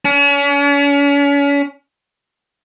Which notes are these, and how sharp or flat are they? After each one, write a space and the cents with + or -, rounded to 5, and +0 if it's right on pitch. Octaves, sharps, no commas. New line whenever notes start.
C#4 +40